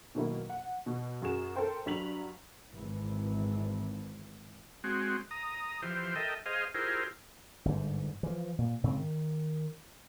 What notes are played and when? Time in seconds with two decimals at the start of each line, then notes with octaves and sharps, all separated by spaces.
0.15 B2 D#3 F#3 A#3 E4
0.49 F#5
0.86 B2
1.22 F#2 F#4 G#4 E7
1.56 A4 A#4 C5 G5
1.86 G2 F#3 B6 F7 F#7
2.74 G#1 G#2 E3
4.84 G#3 C4 F#4
5.31 A#5 D#6
5.82 E3 F3 G4 C5
6.16 A4 A#4 D#5 E5 G5
6.46 G#4 C5 D#5 F5
6.75 E4 F4 G4 G#4 A#4 C5
7.65 G1 G#2
8.23 E3 F3
8.58 A#2
8.83 G#2 C#3 C4
8.97 D#3